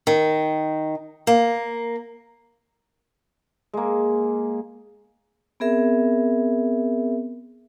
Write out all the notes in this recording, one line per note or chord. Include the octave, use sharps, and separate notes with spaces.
D#3
A#3
G#3 A#3
B3 C4 G#4 A#4 E5